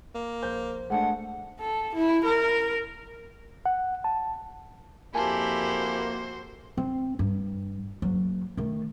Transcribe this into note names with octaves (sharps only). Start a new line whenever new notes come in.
A#3
A#1 C5 G6
G#3 A3 D4 F#5
A4
E4
A#4
F#5
A5
F2 A#3 E4 F#4 G4 C5 G#5 A5
C4
G2
F#1 F#3
D#3 A3